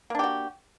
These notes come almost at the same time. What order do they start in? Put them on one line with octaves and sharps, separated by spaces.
A#3 D4 G4 F#4